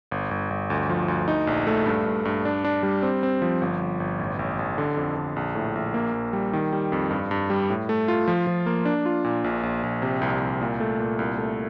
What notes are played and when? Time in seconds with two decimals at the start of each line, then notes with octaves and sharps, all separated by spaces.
0.11 G1
0.31 G1
0.50 G1
0.70 D2
0.89 F3
1.08 D2
1.28 D#4
1.47 A#1
1.67 A3
1.86 G2
2.06 G2
2.25 G2
2.45 D4
2.65 D4
2.83 G3
3.03 C4
3.23 C4
3.42 F3
3.61 G1
3.81 G1
4.00 G1
4.19 A1
4.39 A1
4.59 A1
4.78 D3
4.97 F2
5.17 D3
5.36 A#1
5.55 A2
5.75 A#1
5.94 A#3
6.13 A#1
6.33 G3
6.53 D#3
6.73 G3
6.92 F2
7.11 G2
7.31 G2
7.50 G3
7.70 A2
7.89 A3
8.08 F4
8.28 F3
8.47 F3
8.66 A#3
8.85 D4
9.06 F4
9.24 A#2
9.44 A#1
9.63 A#1
9.83 A#1
10.02 C3
10.21 C2
10.41 C2
10.62 A#2
10.80 A3
11.00 A#2
11.19 C2
11.38 A3